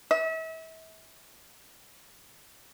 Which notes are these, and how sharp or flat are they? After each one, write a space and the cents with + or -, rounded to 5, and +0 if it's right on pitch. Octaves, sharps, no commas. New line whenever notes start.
E5 -35